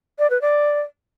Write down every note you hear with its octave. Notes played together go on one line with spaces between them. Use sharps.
D5
B4
D5